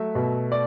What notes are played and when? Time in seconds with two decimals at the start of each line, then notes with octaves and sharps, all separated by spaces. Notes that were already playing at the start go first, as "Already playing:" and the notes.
Already playing: F#3 A3 E5
0.15 B2
0.52 D5